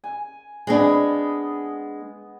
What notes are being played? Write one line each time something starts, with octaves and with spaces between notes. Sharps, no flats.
G#5
G#3 B3 C4 D4 D#5 G#5